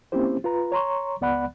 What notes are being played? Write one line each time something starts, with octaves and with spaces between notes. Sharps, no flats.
A#3 C4 C#4 E4 G4 C5
F4 B4 A#5
C#5 A#5 C6 C#6
C#2 B3 D5 F#5 B5 F#6